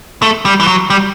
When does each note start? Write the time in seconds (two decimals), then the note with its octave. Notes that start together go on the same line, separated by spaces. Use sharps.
0.22 A3
0.46 G3
0.60 E3
0.67 F#3
0.90 G3